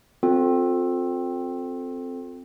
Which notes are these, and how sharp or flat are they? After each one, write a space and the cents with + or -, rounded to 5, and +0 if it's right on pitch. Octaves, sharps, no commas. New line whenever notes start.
C4 +0 F4 +30 A4 +0